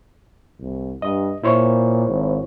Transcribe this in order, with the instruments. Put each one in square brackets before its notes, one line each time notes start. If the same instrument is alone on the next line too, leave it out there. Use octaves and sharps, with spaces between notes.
[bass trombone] C2
[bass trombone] G2 [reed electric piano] D#5
[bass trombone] A#2 [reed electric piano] E4 C5 C#5
[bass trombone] G#1